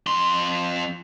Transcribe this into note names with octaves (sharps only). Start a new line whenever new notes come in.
F2 C6